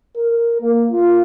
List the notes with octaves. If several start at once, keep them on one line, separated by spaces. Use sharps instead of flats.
A#4
A#3
F4